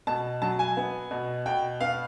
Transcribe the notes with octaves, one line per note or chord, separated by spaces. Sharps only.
B2 A5
F#3 A5
G#5
B3
B2
B2 G5
B3 F5